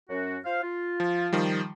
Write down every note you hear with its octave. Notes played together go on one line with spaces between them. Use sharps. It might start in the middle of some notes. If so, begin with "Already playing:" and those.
F#2 C#4 F#4
F4 C5 F5
F4
F3
D#3 F3 G3